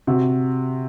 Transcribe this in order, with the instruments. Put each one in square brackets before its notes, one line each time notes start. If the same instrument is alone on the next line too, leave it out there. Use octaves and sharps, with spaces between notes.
[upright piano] C3 F#4